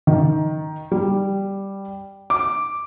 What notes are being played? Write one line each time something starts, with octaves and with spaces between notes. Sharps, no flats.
D#3
G3
D6